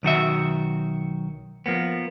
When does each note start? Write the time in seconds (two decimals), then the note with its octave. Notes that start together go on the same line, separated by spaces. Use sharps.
0.03 B1 D#3 F#4 E5
1.66 F3 A#3 B3